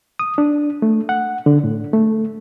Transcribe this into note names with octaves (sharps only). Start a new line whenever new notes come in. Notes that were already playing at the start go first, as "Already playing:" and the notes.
D#6
D4
A3
F#5
D3
A2
A3